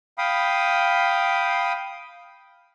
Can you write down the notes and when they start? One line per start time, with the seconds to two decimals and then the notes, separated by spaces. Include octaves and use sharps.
0.18 F5 G5 B5 D#6